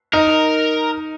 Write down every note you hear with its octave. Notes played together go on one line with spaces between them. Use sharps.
D#4 A#4